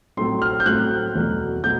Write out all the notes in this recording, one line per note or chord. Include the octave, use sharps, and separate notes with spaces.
A2 F#3 A3 C4 C6
F6
G6
A2 F#3 A3 C4 F#6
E2 B2 F#3 A3
B2 F#3 A3 G6